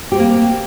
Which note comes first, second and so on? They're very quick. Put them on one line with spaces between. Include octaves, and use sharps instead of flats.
G4 C4 A#3